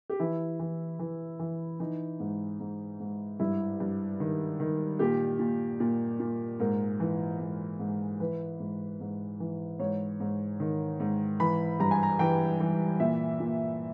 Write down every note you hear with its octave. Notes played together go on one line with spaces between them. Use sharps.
G4
E3 E4
E3
E3
E3
E3 D#4
G#2
G#2
G#2
G2 E4
G2
D#3
D#3
A#2 G4
A#2
A#2
A#2
G#2 A#4
E3
G#2
G#2
E3 B4
G#2
G#2
E3
G#2 C#5
G#2
D#3
G#2
E3 B5
G2 A#5
G#5
A#5
E3 G5
E3
A#2 E5
A#2